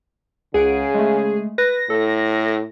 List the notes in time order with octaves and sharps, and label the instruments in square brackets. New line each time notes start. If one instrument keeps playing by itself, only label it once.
[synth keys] C#2 F#5 D7 [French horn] C#3 [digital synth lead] G#4
[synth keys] G#3 A3
[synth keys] B4 [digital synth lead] A#6
[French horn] A2 [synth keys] A4